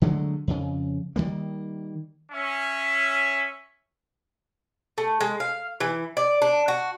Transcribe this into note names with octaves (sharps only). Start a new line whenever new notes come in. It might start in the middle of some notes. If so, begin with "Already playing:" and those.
D3 F#3 G#3 A3
F2 C#3
D#3 F#3 G3 A#3
C#4 E5
A3
G#3
F5
E3
D5
D4
F#4